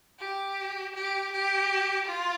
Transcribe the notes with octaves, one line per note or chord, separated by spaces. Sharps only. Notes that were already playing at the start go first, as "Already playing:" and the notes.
G4
G4
G4
F4